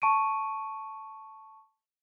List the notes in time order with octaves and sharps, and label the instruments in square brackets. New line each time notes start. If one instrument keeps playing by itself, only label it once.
[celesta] A5 C#6 D7 D#7